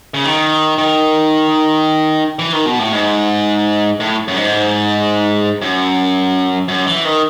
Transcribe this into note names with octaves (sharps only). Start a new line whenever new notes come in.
C#3
D#3
D#3
E3
D#3
B2
A2
G#2
A2
F#2
G#2
F#2
F#2
E3
D#3